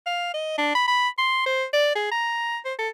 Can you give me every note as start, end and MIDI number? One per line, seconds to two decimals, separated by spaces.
0.06 0.33 77
0.34 0.57 75
0.58 0.72 62
0.75 0.83 83
0.88 1.08 83
1.18 1.42 84
1.46 1.65 72
1.73 1.91 74
1.95 2.10 68
2.12 2.58 82
2.65 2.74 72
2.79 2.89 69